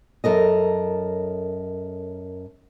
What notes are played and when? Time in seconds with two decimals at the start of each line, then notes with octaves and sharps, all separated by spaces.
0.24 F#2 A4 A#4 D#5